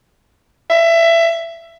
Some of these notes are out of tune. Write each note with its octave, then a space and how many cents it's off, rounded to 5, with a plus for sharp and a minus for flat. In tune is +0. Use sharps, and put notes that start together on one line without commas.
E5 +20